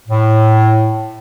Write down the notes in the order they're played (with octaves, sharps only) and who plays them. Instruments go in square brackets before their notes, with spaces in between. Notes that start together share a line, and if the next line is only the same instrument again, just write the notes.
[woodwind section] A2